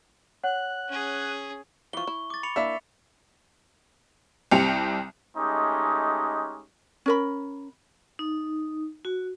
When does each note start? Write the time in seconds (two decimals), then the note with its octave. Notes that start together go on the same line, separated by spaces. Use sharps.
0.43 C#5 F#5 F#6
0.88 C#4 G#4
1.93 E3 F3 C#6 G7
2.07 E4
2.30 D6 A6
2.43 B5 C#7 F7
2.56 A#3 D4 E4 E5
4.52 C2 C4 G4 C#7 F7
5.37 G#3 A3 C#4 D#4 G4
7.06 C#4 A#4 B5
8.19 D#4
9.05 F#4